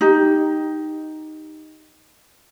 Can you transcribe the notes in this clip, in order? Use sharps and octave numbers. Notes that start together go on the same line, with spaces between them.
D#4 G4